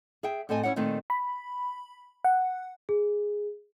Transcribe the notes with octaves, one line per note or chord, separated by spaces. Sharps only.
G#4 E5 G5
A2 C4 A4 D#5 G#5
C#4 D#4 E4 C#5 F#5
A#2 D#3 A3 C4 D#4
B5
F#5
G#4